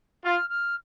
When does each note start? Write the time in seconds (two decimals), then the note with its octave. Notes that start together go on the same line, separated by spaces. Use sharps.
0.25 F4 F6
0.50 F6